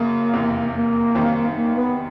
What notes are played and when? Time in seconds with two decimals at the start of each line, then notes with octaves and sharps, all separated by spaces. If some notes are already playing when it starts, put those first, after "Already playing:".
Already playing: F#2 C#3 F#3 A#3
0.33 F1 E2 C3
0.74 A#3
1.15 F#2 D#3 G3 C4
1.55 A#3
1.76 B3